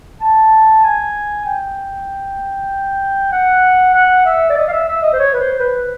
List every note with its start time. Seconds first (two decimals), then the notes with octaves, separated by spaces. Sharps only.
0.21 A5
0.84 G#5
1.45 G5
3.32 F#5
3.94 F#5
4.25 E5
4.50 D5
4.57 D#5
4.68 F5
4.72 E5
4.88 E5
5.02 D#5
5.13 C5
5.19 C#5
5.33 B4
5.40 C5
5.59 B4